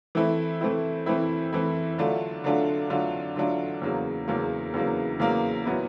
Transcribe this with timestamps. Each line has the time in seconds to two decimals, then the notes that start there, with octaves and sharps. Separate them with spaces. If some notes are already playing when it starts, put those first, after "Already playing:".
0.15 E3 A3 C4 E4
0.61 E3 A3 C4 E4
1.06 E3 A3 C4 E4
1.53 E3 A3 C4 E4
1.98 D3 F#3 A3 D4 F4
2.44 D3 F#3 A3 D4 F4
2.90 D3 F#3 A3 D4 F4
3.36 D3 F#3 A3 D4 F4
3.82 E2 C#3 F#3 A#3
4.28 E2 C#3 F#3 A#3
4.74 E2 C#3 F#3 A#3
5.20 E2 C#3 F#3 A#3
5.65 A#2 F#3 B3 E4